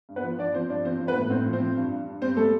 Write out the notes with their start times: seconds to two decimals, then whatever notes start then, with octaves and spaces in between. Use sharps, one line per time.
0.09 G2
0.16 B3 B4
0.23 F3
0.39 F3 D4 D5
0.54 F3 C4 C5
0.69 G2 D4 D5
0.85 F3 C4 C5
1.01 F3
1.07 B3 B4
1.16 A2
1.30 A2 C4 C5
1.45 F3
1.53 C4 C5
1.60 F3
1.77 G2
1.91 G2
2.07 G2
2.21 G3 C4 C5
2.37 G3 A3 A4